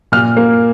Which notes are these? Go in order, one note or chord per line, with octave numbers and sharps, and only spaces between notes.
A#2 F6
A#3